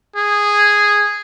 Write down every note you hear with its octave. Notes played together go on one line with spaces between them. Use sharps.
G#4